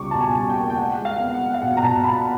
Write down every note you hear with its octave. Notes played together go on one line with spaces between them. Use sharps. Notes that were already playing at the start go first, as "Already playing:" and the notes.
Already playing: C#2 B2 G3 C#6 D6
B2 A5
G#5
G3
G5
A#3
G5
G#3 F#5
G#3
F5
B3
F#5
G#3
F5
B2 F#5
A#5
B2 A5
B3 B5